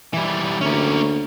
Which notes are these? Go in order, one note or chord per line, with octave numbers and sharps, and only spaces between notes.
E3 G3
D2 A#3 C#4